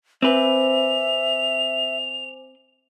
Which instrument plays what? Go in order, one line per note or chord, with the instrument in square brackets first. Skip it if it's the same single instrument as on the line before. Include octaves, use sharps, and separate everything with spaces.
[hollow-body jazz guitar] C4 B4 [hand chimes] C5 G#5 D6 [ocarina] E5 [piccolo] F7